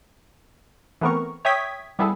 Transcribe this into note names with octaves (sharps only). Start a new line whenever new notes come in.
E3 A3 B3 C4 A#4 C#6
C#5 E5 G5 D#6 G#6 B6
G3 B3 E4 G#4 A4